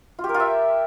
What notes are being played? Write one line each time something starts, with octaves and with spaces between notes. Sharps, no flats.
F4
G4
A#4
F4
E5